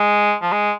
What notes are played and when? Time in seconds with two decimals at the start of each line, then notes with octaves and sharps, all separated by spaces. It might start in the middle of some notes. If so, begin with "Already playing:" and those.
Already playing: G#3
0.42 F3
0.52 G#3